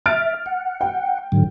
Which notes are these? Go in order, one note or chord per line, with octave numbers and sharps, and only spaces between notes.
E5 F6 A6 D7
F#5
G5
G#2 D3 F#3